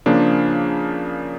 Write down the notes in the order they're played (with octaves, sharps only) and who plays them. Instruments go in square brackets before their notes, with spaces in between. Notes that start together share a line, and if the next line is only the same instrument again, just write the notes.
[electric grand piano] C#3 F3 A#3 D4